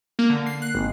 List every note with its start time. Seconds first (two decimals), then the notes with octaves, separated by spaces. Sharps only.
0.19 A#3
0.30 D3
0.46 C7
0.62 F#6
0.75 G#1